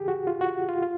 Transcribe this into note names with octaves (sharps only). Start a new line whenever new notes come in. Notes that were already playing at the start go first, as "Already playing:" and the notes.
Already playing: C#3 E3 G4 G#4
F#4
F4
F#4
F4
F4